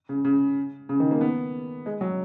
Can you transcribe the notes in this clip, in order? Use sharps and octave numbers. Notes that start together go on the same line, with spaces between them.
C#3
C#3
C#3
D#3
A#3
B3
G#3
F#3